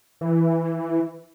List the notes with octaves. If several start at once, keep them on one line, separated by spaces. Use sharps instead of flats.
E3